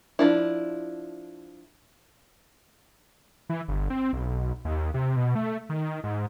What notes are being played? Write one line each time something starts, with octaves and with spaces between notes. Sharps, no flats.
F3 D4 E4
E3
G1
C4
B1
D#2
C3
B2
A3
D#3
G#2